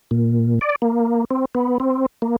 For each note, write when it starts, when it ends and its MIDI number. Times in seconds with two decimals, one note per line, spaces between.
0.11 0.59 46
0.61 0.76 74
0.82 1.25 58
1.31 1.45 60
1.55 1.78 59
1.80 2.06 60
2.22 2.36 58